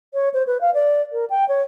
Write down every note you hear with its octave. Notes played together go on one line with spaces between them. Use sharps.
C#5
C5
B4
F5
D5
A#4
G5
C#5